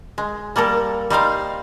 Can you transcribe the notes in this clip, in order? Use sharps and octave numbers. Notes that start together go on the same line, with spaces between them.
G#3
G3 A#3 A4 A#4
G3 D#4 C5 F5